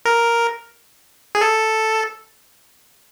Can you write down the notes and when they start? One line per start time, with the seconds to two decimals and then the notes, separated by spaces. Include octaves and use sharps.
0.05 A#4
1.35 G#4
1.41 A4